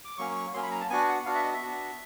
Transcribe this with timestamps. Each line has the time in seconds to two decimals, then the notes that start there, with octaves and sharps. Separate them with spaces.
0.05 D6
0.18 F#3 A#3 C#4 C#6
0.36 C#6
0.53 F#3 A#3 C#4 C6
0.63 B5
0.71 A#5
0.81 A5
0.90 B3 D4 F#4 G#5
1.08 F#5
1.25 B3 D4 F#4 F5
1.35 E5
1.44 D#5
1.53 E5
1.62 B3 D4 F#4